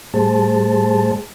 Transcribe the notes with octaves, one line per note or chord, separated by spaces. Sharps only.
A2 G3 A3 G#4 C5 A5